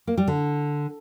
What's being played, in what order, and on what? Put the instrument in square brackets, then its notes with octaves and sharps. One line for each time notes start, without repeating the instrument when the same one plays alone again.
[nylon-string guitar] A#3
G3
D3